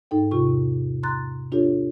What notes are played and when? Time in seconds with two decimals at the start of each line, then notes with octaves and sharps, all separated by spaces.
0.11 G#2 D#4 A4 G5
0.31 E2 C3 F4 G4 C#6
1.03 A#5 C6 F#6 A6
1.52 D4 F4 G4 A4 C#5